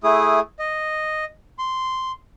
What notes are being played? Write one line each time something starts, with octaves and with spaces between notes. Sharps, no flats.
A3 E4 G#4 D#6
D#5
C6